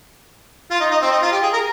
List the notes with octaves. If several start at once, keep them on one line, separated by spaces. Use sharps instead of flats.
F4
D#4
D#4
C4
D#4
F4
G4
G#4
A#4